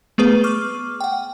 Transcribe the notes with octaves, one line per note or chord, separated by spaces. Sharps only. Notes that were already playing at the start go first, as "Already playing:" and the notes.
A3 B3 G#4 B4
C#6 D6 F6
F#5 G5